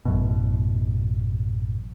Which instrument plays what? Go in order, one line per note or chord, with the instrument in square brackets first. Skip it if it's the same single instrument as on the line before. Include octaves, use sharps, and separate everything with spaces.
[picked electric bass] A1 F#2 B2